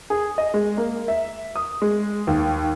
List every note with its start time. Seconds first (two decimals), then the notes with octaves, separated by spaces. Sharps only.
0.10 G#4
0.38 D#5
0.54 G#3
0.77 A#3
1.08 E5
1.56 D#6
1.82 G#3
2.27 D#2